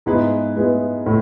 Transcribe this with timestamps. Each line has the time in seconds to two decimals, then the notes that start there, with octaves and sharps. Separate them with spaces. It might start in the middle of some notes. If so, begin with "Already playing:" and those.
0.06 G#2 G#3 B3 E4 B4
0.56 G#3 B3 E4 B4
1.06 A2